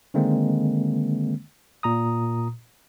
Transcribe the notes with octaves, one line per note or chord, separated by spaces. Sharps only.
D3 D#3 G#3 A#3 C4
A#2 A#5 D#6